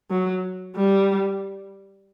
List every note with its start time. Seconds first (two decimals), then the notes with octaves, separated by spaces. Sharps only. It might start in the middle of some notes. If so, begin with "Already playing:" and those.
0.11 F#3
0.76 G3